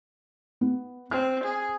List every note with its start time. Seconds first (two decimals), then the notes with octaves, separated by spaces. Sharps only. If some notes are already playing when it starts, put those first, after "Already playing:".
0.61 B3
1.11 C4 F6
1.44 G#4